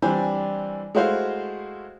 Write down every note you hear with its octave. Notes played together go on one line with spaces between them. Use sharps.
E3 G3 C4 D4 C5 G#5
G#3 A3 E4 F#4 C5 F5